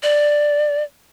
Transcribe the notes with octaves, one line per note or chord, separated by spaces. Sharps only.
D5